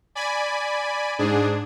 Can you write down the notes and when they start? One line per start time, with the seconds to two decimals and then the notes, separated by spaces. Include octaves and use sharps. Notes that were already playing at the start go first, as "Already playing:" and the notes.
0.15 D5 G#5 B5
1.19 G#2 D4 G#4